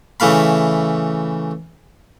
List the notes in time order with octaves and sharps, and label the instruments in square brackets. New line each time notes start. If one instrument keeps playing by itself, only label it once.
[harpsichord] C#3 E3 A3 F5 B5